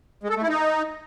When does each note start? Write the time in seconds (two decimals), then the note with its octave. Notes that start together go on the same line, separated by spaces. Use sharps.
0.23 G#3
0.30 A4
0.36 A3
0.43 E4
0.49 D#4